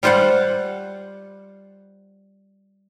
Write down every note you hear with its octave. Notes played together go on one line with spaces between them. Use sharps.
G3 F4 C5 F5 F#5